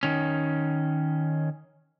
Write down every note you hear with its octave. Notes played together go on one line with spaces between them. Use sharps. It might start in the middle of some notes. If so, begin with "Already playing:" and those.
D#3 C#4